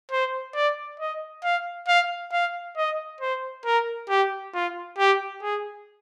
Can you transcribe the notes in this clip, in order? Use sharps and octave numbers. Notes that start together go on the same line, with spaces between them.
C5
D5
D#5
F5
F5
F5
D#5
C5
A#4
G4
F4
G4
G#4